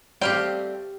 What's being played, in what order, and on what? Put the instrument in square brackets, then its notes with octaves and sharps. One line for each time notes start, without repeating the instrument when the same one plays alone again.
[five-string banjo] G3 A3 C4 [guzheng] G4 F5 G5